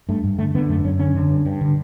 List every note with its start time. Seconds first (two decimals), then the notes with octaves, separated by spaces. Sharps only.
0.09 G2 A3
0.24 G2
0.38 D3 A3
0.55 D3 B3
0.69 F#2 A3
0.84 F#2 C#4
0.99 D3 C#4
1.15 D3
1.30 G2
1.46 G2
1.61 D3